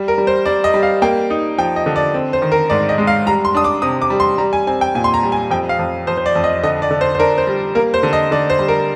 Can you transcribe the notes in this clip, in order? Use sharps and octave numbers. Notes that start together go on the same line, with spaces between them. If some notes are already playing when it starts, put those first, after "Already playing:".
Already playing: G3
A#4
G3
C5
G3 D5
D#5
G3
F5
A#3 G5
D#4
F3 G5
D#5
D3
D5
C4
C5
D#3
A#4
G#2 D5
D#5
G#3
F5
G3 A#5
C6
D4 D#6
D6
C3 D#6
D6
G3
C6
G3 A#5
G#5
C4 G#5
G5
A#2 G#5
C6
A#5
G3
G#5
F2 G5
F5
F2
F2 C5
C5
D5
F2
D#5
D3 D#5
D5
D3
C5
C5
D4 A#4
C5
G3
A#3 A#4
C5
D3
D#5
D3 D5
C5
G3
A#4